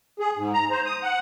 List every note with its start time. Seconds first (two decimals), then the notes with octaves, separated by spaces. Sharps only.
0.19 G#4
0.37 G#2
0.54 A#5
0.71 C5
0.85 D#6
1.03 F#5